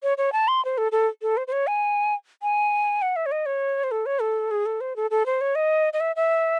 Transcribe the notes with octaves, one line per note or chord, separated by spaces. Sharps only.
C#5
C#5
A5
C6
C5
A4
A4
A4
C5
C5
C#5
G#5
G#5
F#5
E5
C#5
D#5
C#5
C5
A4
C#5
A4
G#4
A4
C5
A4
A4
C5
C#5
D#5
D#5
E5
E5